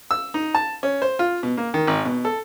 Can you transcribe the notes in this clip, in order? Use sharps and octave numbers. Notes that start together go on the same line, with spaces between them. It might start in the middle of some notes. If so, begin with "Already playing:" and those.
E6
D#4
A5
C#4
C5
F4
B2
A#3
D#3
G#1
B2
A4